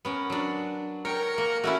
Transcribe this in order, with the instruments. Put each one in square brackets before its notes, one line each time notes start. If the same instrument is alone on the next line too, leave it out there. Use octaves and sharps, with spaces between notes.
[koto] B3 C#4 A#4
F#3 D4
[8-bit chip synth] A#4 C#7 [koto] C#5 G5
[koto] A#3
[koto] A3 C#4 E4 [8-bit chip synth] F#4